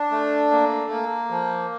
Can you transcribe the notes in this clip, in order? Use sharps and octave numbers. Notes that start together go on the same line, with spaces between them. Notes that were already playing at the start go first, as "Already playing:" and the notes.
Already playing: D4
A3
A#3
A#3
F3